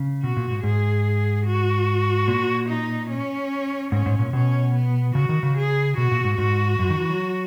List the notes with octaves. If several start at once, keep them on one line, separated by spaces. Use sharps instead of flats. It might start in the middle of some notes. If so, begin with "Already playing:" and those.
Already playing: C#3
B2 F#4
A#2
G#2
G#2 G#4
F#4
A#2
D#4
C#4
G#2 C#4
G#2
A#2
B2 C#4
B3
C#3 F#4
D#3
C#3
G#4
B2 F#4
A#2
G#2
G#2 F#4
F#2
D#3
E3
F#3